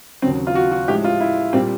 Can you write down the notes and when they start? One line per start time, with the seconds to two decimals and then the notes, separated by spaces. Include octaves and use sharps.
0.22 D#2 C#3 F#3 C4
0.47 F4
0.55 F#4
0.71 F#4
0.88 A2 F3 G#3 G4
1.04 F4
1.20 E4
1.53 A#2 G3 C4